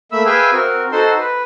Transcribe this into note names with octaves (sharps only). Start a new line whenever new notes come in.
A3 A#3 E5 B5 E6
G#4 B4 E5 F5 G5 G#5
C4 F#4 A#4
D#4 F#4 A4 C5 C6
B4